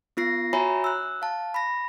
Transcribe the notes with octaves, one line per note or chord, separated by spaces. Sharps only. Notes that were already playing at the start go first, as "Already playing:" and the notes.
B3 F4 A#6 C7
F#4 C#5 E5 G#5 A#5 B5
E6 F#6
F5 A5
B5 A#6